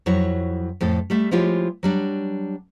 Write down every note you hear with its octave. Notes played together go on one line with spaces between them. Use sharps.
F2 F#3 E4 C#5
F2 A2 A4
G3 A3 E5
F3 G#3 E4 F4 G4 C#5
F#3 G3 D4